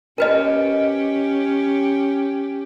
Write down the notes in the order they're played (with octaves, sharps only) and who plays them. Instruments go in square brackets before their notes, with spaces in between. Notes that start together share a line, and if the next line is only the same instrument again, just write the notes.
[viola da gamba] C#4 G4 [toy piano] A#4 B4 D#5